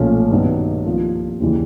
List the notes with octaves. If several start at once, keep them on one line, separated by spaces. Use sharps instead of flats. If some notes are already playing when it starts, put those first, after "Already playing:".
Already playing: B1 A#2 F3 A3 C#4
G2 D#3 F#3 B3 D#4
C2 C3 F3 A#3
D#2 C#3 E3 G3